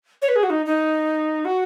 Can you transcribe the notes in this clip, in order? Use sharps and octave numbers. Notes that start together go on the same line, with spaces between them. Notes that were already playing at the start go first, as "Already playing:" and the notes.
C#5
B4
G#4
F#4
D#4
D#4
F#4